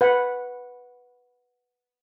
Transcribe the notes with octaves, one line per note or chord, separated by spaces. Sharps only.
B4 F#5 B5